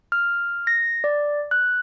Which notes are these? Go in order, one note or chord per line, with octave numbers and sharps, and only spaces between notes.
F6
A#6
D5
F#6